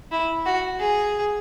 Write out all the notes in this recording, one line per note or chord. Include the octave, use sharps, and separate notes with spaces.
E4
F#4
G#4